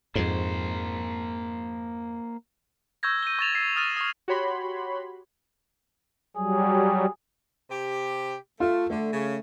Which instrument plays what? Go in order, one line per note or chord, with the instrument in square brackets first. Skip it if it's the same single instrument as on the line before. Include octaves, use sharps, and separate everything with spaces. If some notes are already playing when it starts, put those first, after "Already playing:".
[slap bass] F2 G#2 [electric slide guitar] A#3 C5
[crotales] C#6 E6 G6 G#6 A#6
D#7 G7
C#6 G6 A6 E7 F7
E6 A6 C7
D#6 F6 A6 D#7
C#6 D#6
[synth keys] F#4 G4 C#5 B5 C6
[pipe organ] F#3 G3 [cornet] G#4
[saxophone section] C3 G4
[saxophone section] A3 [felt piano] F4
[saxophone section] D3 [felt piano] A3
[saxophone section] C#3